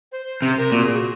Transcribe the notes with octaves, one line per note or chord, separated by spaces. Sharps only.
C5
C3
A#4
A#2 F#4
G#4
F#4